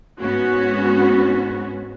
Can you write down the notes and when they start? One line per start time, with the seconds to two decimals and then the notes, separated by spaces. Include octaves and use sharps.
0.21 G#2 B3 C#4 F#4